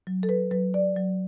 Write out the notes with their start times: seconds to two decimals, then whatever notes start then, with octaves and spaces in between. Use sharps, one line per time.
0.07 F#3
0.23 A4
0.29 B4
0.51 F#3 B4
0.74 D5
0.96 F#3